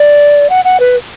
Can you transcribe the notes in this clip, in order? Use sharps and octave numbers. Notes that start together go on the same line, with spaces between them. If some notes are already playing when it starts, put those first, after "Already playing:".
Already playing: D5
F#5
F#5
B4